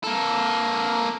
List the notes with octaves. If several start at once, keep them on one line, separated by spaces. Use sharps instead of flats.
A#3 A4